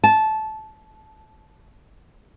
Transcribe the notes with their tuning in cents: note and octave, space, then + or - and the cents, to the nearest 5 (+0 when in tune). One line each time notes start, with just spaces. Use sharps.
A5 -15